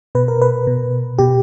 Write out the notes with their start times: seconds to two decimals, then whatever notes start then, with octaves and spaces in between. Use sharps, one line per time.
0.15 B2 B4
0.28 A#4
0.42 B4
0.67 B2
1.18 B2 G4